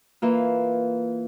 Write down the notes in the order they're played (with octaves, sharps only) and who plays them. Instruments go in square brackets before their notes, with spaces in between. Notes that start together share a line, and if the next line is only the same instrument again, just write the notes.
[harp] E3 A#3 F4